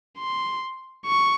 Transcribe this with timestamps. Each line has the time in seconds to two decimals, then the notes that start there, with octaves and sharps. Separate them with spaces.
0.18 C6
1.06 C#6